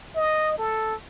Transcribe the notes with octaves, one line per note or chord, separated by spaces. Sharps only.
D#5
A4